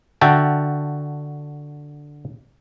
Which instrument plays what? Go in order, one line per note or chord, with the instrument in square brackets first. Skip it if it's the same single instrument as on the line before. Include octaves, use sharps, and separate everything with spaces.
[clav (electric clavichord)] D3 F#4 E5 G5 A5